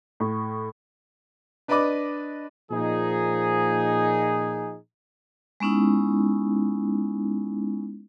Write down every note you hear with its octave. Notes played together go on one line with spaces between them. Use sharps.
A2
D4 B4 D5 D#5 B5 D6
A#2 F3 D#4 G#4
G#3 B3 C#4 D#4 E4